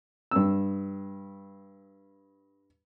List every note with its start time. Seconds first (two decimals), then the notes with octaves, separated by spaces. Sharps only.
0.31 G2 E6